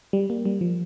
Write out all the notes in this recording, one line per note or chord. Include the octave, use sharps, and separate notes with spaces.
G3
A#3
G3
F3